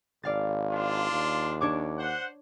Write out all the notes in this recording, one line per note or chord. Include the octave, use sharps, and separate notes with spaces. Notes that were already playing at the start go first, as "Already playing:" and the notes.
G#1 D5 F5 A6
D4 F4 C6
D#2
D4 C#5 D6
C5 F#5